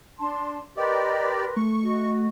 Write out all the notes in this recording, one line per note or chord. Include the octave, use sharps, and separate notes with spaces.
D4 A5 C6
G4 A#4 B4 D5 D#5 C6
A3 C#6
F#4 D#5